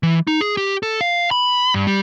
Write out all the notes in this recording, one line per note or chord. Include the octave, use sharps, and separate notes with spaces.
E3
D#4
G#4
G4
A4
F5
B5
G2
G3